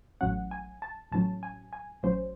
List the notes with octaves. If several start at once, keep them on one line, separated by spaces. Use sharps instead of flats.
A1 A2 F#3 C#4 F#5
G#5
A5
A1 A2 F#3 C#4 A5
G#5
G#5
A1 A2 F#3 C#4 C5